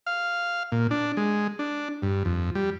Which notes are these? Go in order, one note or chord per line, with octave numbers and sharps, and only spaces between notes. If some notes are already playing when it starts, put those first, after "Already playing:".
F5
A#2
D4
G#3
D4
G2
F2
G3